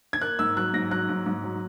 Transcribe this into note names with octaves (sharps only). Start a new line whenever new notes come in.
G#6
A#3 F#6
G#2 E6
F#3 F#6
G#2 A#6
F#3 F#6
G#2
G#2
F#3